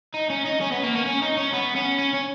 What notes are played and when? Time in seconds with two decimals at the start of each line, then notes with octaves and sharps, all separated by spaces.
0.14 D#4
0.30 C#4
0.46 D#4
0.61 C#4
0.72 B3
0.83 A#3
0.95 C#4
1.06 C#4
1.22 D#4
1.37 C#4
1.53 B3
1.76 C#4
1.99 C#4
2.14 C#4